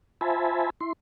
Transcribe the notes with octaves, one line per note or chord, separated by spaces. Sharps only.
F4 C5 E5 G#5 A5 B5
E4 C6